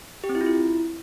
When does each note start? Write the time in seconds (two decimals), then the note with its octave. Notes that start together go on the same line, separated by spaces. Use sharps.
0.24 G4
0.29 C4
0.35 E4
0.41 F4
0.46 E4